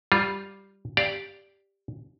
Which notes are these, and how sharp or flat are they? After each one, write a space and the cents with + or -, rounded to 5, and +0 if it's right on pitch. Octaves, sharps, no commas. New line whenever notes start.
G3 +0 F4 +0
G4 +5 D5 +0 F5 -10